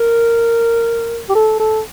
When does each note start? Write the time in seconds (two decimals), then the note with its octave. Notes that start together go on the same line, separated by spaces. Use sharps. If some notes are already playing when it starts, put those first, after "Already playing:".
Already playing: A#4
1.29 G4
1.35 A4
1.59 A4